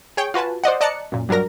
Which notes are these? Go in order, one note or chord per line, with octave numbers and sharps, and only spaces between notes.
G#4 C#5 G5
F4 F#4 B4 G#5 A5
C5 D5 D#5 F#5
D5 D#5 A5 A#5 F#6 C#7
F#2 A#2
G2 F#3 D4 A#4 A#6